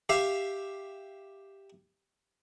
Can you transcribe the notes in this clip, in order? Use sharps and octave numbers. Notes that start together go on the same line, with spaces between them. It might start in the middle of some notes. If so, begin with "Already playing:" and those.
G4 E5 F5